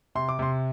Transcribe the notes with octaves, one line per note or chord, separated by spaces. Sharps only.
C3 C6
D6
C3 C6